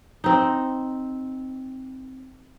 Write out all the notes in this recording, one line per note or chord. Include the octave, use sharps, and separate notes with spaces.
C4 D#4